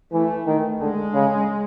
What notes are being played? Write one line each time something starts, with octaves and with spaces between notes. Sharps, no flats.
E3 A3
D#3
D3 G#3
C#3